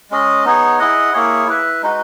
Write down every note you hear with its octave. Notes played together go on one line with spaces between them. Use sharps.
G#3 C#4 G#4 D#5
B3 D#4 G#4 C#5
E4 G#4 D#5 F#5
A#3 E4 G#4 C#5
E4 B4 E5
G#3 D#4 F#4 B4